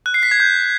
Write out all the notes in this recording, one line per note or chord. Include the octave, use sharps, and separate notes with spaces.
F#6
C7
B6
G#6
G6